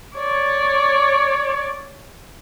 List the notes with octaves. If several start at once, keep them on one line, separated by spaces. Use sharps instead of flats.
C#5 D5